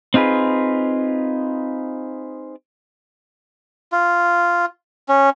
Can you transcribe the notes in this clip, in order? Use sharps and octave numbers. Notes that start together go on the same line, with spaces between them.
C4 D#4 F4 G#4 B4
F4
C#4